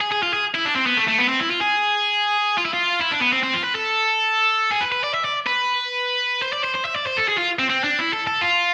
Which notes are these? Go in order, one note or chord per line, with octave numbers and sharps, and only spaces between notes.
G#4
G#4
F4
G#4
E4
D4
C4
B3
A3
A3
B3
C4
E4
F4
G#4
F4
E4
F4
E4
D4
B3
C4
C4
F4
B4
A4
G#4
B4
B4
D5
E5
D5
B4
C5
D5
C5
C5
E5
D5
C5
A4
G#4
F4
C4
C4
D4
E4
A4
A4
F4